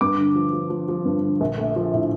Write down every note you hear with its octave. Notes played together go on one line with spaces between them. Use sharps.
G2 D6
D3
F3
F3
F3
F3
G2
D3
A#1
A3
F3
A2